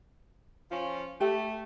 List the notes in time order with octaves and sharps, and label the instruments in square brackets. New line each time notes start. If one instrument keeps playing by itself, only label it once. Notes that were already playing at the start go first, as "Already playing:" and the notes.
[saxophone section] F3 C#4 F4
[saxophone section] A3 [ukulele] G4